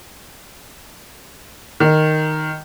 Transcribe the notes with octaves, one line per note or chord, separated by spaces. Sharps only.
D#3